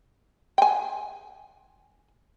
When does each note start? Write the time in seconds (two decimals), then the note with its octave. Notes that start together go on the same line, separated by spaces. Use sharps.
0.58 G5 G#5